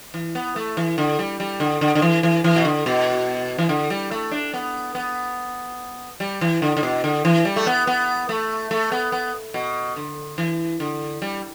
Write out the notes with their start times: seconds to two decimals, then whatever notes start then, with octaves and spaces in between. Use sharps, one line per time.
0.14 E3
0.35 B3
0.56 A3
0.77 E3
0.98 D3
1.19 G3
1.40 G3
1.60 D3
1.81 D3
1.95 D3
2.02 E3
2.23 E3
2.44 E3
2.56 B2
2.65 D3
2.86 B2
3.58 E3
3.69 D3
3.90 G3
4.11 A3
4.31 D4
4.54 B3
4.95 B3
6.20 G3
6.41 E3
6.62 D3
6.77 D3
6.83 B2
7.04 D3
7.25 E3
7.45 G3
7.56 A3
7.67 B3
7.87 B3
8.29 A3
8.71 A3
8.92 B3
9.12 B3
9.54 B2
9.96 D3
10.38 E3
10.80 D3
11.22 G3